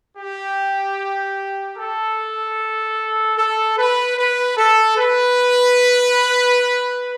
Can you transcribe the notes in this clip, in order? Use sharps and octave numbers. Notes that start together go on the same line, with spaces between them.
G4
A4
A4
B4
B4
A4
B4